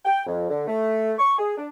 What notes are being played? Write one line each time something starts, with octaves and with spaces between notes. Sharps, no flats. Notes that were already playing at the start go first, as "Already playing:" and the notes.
G5
F2
D3
A3
C#6
G#4
D4